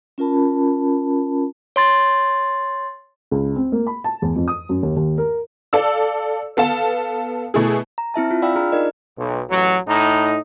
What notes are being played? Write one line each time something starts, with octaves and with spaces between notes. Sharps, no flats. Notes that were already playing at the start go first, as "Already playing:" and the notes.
C#4 F4 A#4 A5 B5
C#5 C6 A6
C#2
C4
A#3
B5
A5
E2
F2
D#6
F#2
D#2
D#2
A#4
A4 D5 F5 E6
B3 A4 F5 A5
B2 A3 E4 G#4
A#5
C4 E4 E5 A5
F4
D5 F5 G5 B5 E6
D4 F4 G#4 A#5 F6
D#4 A#4 D5 D#5
B1
A1 F#3
A2 D#4